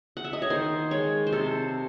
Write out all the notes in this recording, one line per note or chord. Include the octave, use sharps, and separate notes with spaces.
F#5
E5
D#5
C#5
D#3 C5
G#3 C#5
C5
C3 A4